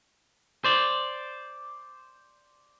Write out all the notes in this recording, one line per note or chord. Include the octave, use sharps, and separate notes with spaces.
C5 D5